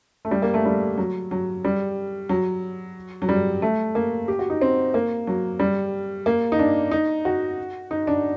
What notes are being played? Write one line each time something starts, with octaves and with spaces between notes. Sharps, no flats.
A3
G3
A#3
A3
G3
F#3
F#3
G3
F#3
F#3
G3
A3
A#3
G4
F#4
D#4
C4
A#3
F#3
G3
A#3
D#4
D4
D#4
F#4
D#4
D4